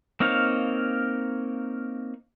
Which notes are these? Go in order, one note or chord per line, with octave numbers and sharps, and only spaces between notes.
A#3 C4 D#4 C#5 F5